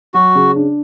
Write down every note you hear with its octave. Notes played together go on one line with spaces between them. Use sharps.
F#3 F#4
C#3
D4